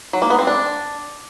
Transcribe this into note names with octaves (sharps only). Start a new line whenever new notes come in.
F#3
A#3
B3
C4
D4